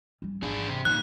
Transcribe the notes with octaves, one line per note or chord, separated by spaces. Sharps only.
G3 C#4
G#1 E3 D4 G#4
C3 C4
A#2 D#3 E3 F#6